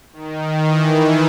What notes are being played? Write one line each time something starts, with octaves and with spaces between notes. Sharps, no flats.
D#3
E3